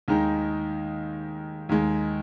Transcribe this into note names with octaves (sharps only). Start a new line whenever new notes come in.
D#2 D#3 G#3 D#4
D#2 D#3 G#3